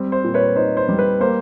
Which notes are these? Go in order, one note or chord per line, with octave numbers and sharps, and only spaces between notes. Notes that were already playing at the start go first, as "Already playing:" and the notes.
Already playing: G3 C4
C5
A#2
B4 C#5
D#4 C5
C5
G3
B4
A#3 C5